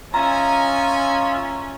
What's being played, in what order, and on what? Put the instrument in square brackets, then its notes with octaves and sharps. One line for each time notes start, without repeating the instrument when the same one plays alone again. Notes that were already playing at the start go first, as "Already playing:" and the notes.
[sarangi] C#4 [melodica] F4 [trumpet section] D#5 E5 G#5 [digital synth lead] A#5